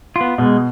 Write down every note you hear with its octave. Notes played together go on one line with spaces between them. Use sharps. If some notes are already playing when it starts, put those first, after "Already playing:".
F4
B3
B2 G#3